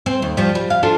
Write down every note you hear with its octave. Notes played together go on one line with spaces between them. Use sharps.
C4
D#2
F3 G3
G3
F5
D4 F4 A4